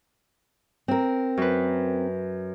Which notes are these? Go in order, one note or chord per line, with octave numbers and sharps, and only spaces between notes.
C4 A#4
F#2 B4